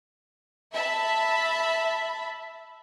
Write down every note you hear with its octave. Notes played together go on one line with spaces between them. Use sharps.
E5 A5 B5